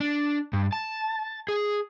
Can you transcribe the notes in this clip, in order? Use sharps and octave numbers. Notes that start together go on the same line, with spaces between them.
D4
G2
A5
G#4